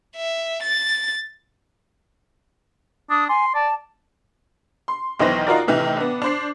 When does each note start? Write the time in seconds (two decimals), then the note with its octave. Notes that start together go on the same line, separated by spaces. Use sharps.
0.16 E5
0.62 A6
3.10 D4 D#6
3.29 G#5 C6
3.55 D5 A5
4.88 C6
5.19 B1 D#3 E3 C5 A#6
5.47 D#4 F4 F#4 A#4 D5
5.67 A2 C3 D#3 E3
5.97 B3 D4
6.22 D4 C5 C7